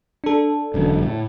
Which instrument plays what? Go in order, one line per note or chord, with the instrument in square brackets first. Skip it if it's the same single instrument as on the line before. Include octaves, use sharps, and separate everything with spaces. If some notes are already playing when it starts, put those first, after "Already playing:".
[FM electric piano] D4 A4
[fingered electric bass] E1 F#2 D3
A2